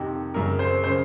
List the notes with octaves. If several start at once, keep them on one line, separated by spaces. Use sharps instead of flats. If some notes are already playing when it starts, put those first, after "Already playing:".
Already playing: F2 C3 D#3
F#2 C#3 A#4
C5
C#3 C5